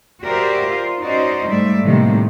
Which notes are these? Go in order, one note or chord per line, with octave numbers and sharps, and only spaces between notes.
F#4 G4 A#4 C5 D5 E5
F4 C5
C#4 D#4 F#4 C5 D5 D#5
G#2 G3 A3 D5 E5
A2 C3 D#3 G3 G#3 A#3